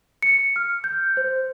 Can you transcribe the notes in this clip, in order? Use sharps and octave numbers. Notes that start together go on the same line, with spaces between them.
C#7
F6
G6
C5